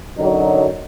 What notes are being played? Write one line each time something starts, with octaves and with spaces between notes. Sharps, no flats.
F#2 D3 F#3 D#4